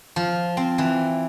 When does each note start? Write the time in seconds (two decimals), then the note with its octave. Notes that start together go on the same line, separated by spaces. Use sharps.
0.16 F3
0.57 C4
0.78 E3